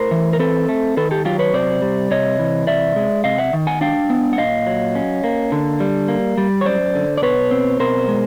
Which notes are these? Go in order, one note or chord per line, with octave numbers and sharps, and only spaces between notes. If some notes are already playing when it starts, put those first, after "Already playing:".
Already playing: A2 A#4 C5
E3
A#4
C4 A4 B4
A3
D#3 A4 B4
G4 A4
F#3 F4 G4
B4 C#5
C3 C5 D5
G3
C3 C#5 D#5
E3
C3 D5 E5
G#3
C3 D#5 F5
E5 F#5
D#3
F#5 G#5
D4 F5 G5
B3
F#5
A#2 D#5 F5
F#3
C#4
A#3
D3
G3
A#3
G3
C#5
F#2 C5 D5
D3
D5
B2 B4 C#5
C4
B2 A#4 C5
G#3